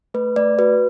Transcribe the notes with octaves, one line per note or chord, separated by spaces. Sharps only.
A3 B4
A3 D5
F#4 B4